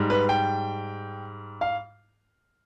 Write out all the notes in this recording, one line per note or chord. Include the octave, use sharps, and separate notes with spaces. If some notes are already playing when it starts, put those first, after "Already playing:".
Already playing: G#2 G3
B4
G5
F5